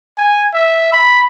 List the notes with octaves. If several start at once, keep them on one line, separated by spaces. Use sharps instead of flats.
G#5
E5
B5